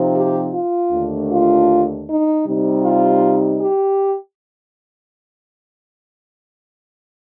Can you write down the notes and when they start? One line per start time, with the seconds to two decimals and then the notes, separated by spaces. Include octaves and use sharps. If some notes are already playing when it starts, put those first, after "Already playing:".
Already playing: C3 F3 C4 D#4
0.15 G4
0.53 F4
0.91 D#2 D3 A3 D4
1.30 F4
2.07 D#4
2.46 C3 G3 C4 D#4
2.84 F4
3.61 G4